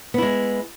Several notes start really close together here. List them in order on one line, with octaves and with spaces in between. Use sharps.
B3 E4 G#3